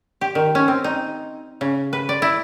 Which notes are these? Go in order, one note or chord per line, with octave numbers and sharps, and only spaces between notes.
G4
D#3
C#4
C4
D#4
C#3
B4
D5
E4